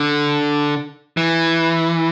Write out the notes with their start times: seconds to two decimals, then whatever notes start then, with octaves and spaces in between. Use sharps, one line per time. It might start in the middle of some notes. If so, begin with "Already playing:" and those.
Already playing: D3
1.17 E3